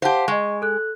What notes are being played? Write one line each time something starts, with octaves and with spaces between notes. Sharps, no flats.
G4 C5 F5 F#5 A5
G#3 D#5 C#6
A4 F#6